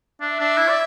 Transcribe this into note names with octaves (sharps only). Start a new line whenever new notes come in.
D4 E5
D4
E4
D5